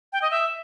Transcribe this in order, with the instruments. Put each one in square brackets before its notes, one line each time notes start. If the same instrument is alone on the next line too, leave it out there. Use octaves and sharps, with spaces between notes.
[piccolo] G5
D#5
E5